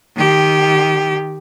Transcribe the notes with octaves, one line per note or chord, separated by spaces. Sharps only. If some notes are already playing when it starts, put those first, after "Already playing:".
D#3 G4